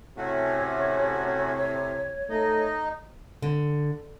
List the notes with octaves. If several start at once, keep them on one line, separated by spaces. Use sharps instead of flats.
A2 C3 A3 C#4 F#4 C#5
A3 D#4 D#5
D3